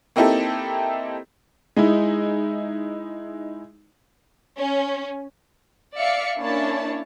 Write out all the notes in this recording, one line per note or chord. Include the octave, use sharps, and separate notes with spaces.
A#3 C4 D#4 E4 G4 A4
G#3 D#4 E4
C#4
D5 E5 F5 C#7
A#3 C#4 D4 E4 C#5 A5